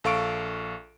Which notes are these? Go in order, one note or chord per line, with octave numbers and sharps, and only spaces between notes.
A#1 A4 F5 C#6 D7